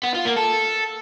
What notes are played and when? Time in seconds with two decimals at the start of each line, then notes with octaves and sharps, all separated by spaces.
0.04 B3
0.15 F4
0.26 A#3
0.37 A4